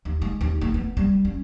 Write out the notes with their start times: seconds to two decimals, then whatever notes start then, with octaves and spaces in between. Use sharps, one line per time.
0.05 D#2
0.22 G#3
0.41 D#2
0.61 A3
0.74 B3
0.97 G3
1.25 C#4